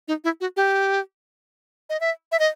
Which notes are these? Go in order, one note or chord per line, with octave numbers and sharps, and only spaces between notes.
D#4
E4
F#4
G4
D#5
E5
E5
D#5